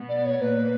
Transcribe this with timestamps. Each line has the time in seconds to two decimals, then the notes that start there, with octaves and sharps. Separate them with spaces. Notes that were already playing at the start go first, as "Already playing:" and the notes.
Already playing: B2 B3
0.09 D5
0.25 C#5
0.41 A#2 A#3 B4